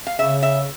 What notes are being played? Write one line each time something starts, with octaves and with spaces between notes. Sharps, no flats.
F5
C#3 E5
E5